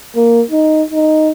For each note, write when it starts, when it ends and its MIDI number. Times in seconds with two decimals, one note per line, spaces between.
0.16 0.42 58
0.51 0.84 63
0.91 1.32 63